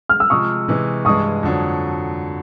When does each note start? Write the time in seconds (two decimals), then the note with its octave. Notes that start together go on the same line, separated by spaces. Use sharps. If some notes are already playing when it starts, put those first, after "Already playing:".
0.09 F6
0.20 E6
0.30 C3 F3 G#3 C#6 D#6
0.68 C3 E3 G#3
1.05 G2 E3 G#3 C#6 D#6
1.43 F2 D3 F#3